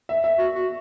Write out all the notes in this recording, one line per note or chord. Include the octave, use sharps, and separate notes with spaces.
E5
E5
F#4
F#4